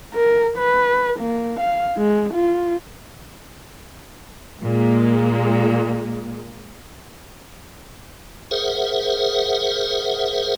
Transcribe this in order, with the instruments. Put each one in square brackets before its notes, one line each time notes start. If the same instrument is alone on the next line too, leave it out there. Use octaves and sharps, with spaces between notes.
[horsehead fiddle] A#4
B4
A#3
F5
G#3
F4
[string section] A#2 G#3 A#3
[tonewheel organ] G#4 A#4 C5 E5 F#5